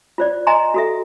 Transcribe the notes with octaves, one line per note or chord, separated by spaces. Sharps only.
F4 C5 D5
D#5 G#5 A#5 C6
F#4 A4 E5